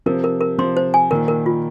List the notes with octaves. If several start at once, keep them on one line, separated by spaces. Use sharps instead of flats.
C3 F3 A#4
A#4
A#4
C3 F3 C6
C5
G#5
A#2 D#3 A#4
A#4
F4